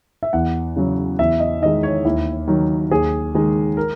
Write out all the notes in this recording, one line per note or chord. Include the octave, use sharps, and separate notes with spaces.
E5
E2 F#5
C#3 F#3
E2 E5
D#5
D#3 G#3 D#5
C#5
D#2 E4
D#3 F#3
D#2 G#4
D#3 G#3
A#4